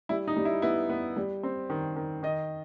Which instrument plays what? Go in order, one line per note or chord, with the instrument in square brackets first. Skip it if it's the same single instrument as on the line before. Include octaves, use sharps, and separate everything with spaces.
[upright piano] G3 E4
D#4
G3
E4
B3 E4
B3
G3
C4
D#3
D#3
D#3 D#5